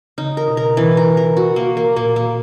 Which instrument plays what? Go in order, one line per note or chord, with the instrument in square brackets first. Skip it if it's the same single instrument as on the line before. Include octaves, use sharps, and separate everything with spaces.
[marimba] C#3 [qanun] D#4
[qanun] A#4
[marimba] B2
[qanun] A#4
E3
A#4
A#4
F#4
A#3
A#3
[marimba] A#2 [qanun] A#3
[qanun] A#3